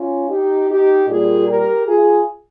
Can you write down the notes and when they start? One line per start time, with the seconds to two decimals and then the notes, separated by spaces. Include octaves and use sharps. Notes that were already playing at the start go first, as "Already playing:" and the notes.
Already playing: C#4 F4
0.29 D#4 G4
0.69 D#4 G4
1.07 A#2 G3 A#3 F4 G#4
1.47 G4 A#4
1.86 F4 G#4